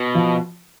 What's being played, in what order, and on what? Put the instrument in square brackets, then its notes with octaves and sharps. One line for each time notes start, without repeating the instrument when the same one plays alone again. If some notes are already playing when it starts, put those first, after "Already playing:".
Already playing: [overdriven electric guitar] B2
[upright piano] F3